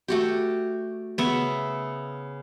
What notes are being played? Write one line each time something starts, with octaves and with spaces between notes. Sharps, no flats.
A3 F#4 G4
C#3 B3 E5